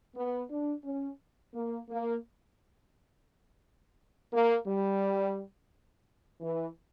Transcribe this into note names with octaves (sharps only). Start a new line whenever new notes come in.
B3
D4
C#4
A#3
A#3
A#3
G3
E3